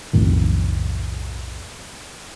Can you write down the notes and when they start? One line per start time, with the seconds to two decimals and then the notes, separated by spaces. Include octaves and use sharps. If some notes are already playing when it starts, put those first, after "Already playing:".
0.13 B1 F2 A2 D#3